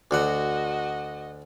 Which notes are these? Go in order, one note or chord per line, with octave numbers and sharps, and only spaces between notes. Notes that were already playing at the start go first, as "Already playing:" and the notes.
D2 D3 F#4 D#5 F#5